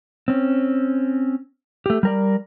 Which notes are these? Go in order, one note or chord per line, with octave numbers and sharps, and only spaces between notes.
C4 C#4
A3 G4
G3 A#4 D5